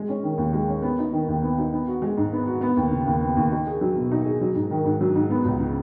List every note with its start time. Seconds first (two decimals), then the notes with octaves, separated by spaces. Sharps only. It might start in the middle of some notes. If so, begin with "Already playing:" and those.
Already playing: G#3
0.08 C#4
0.23 D#3
0.38 D#2
0.53 G#3
0.68 C#4
0.82 B3
0.98 D#4
1.13 D#3
1.28 D#2
1.43 B3
1.58 D#4
1.73 B3
1.88 F#4
2.02 G#3
2.17 G#2
2.33 B3
2.47 F#4
2.61 B3
2.76 D#2
2.92 C#3
3.06 D#2
3.21 B3
3.37 D#2
3.51 D#4
3.67 G#4
3.81 F#3
3.96 B2
4.11 D#4
4.25 G#4
4.41 F#3
4.55 G#2
4.70 D#3
4.85 G#2
5.01 F#3
5.15 G#2
5.30 B3
5.45 C#2
5.60 C#3